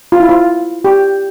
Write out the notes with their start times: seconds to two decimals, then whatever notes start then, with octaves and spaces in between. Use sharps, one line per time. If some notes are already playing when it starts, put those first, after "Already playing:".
0.12 F4
0.20 E4
0.29 F4
0.85 G4